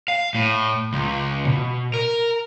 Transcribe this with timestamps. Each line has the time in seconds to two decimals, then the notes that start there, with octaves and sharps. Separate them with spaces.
0.08 F5
0.35 A2
0.93 C#2
1.47 B2
1.94 A#4